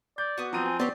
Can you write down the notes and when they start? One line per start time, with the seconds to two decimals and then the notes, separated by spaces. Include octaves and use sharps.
0.18 D5 G6
0.38 B3 F#4
0.53 F3 C4 A#5 D#7
0.66 G#5
0.80 B3 C4 G4 C#5 D5